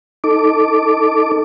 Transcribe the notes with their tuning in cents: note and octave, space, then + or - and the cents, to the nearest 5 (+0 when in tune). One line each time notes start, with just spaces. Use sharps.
D#4 +10 A4 +0 D6 +0